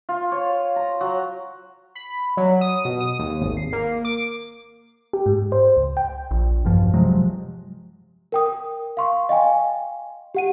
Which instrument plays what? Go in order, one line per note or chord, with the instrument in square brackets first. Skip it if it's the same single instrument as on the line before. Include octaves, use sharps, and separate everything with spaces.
[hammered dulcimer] F4
C#5
A#5
F#3
[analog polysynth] B5
F#3
D#6
B2
D#6
D#2
G#1
C7
A#3
D6
[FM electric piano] G4
G#2
C5
C#2
G5
[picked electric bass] A#1
E1 G2 F3
C3 F3 F#3 G#3
[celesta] A#4 G5 D#6
F5 C6 C#6
D#5 F5 G5 G#5
G4 F#5 D#7